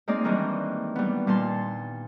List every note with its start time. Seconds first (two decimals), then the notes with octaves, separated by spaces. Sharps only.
0.08 G#3 A#3 C4 D#4 G#4 D5
0.24 D#3 E3 G3 G#3 A#3 D4
0.96 G3 B3
1.27 A#2 G3 A5 C6